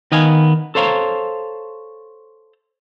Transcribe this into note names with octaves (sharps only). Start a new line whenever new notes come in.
D#3 B3 D#5 F5 G#5
A4 C5 C#5 F5 A#5